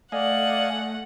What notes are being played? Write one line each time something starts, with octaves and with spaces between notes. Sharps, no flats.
A3 D5 D#5 F5 F#5 G#5